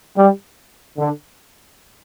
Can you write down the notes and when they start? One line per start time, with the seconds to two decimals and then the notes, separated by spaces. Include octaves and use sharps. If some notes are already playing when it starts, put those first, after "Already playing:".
0.16 G3
0.97 D3